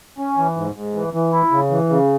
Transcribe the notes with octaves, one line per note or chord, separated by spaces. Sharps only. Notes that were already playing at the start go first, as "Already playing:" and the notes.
C#4
E3
G#2
G#2
E3
E3
E4
C#3
E3
C#3